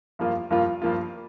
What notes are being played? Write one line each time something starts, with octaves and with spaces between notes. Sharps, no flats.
G2 F3 A#3 F4
G2 F3 A#3 F4
G2 F3 A#3 F4